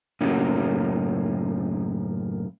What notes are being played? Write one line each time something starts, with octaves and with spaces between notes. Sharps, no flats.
F#2 A2 C#3 A#3 C#4